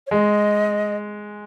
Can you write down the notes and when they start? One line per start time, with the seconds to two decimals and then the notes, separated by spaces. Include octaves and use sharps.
0.07 C#5
0.11 G#3 D#5